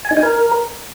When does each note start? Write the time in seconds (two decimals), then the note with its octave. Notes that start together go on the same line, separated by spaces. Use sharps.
0.05 G#5
0.11 D#4
0.17 G#5
0.23 A#4